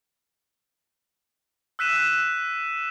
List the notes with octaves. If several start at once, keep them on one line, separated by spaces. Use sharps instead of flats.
E6 F#6 B6 D#7 E7